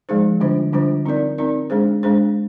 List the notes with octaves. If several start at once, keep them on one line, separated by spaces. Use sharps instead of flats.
F3 G#3 D#4 G#4 C5
D3 G3 D4 F4 C5
D3 G3 D4 F4 C5
C4 D#4 A#4 D5
C4 D#4 A#4 D5
G#3 D4 G#4 C5
G#3 D4 G#4 C5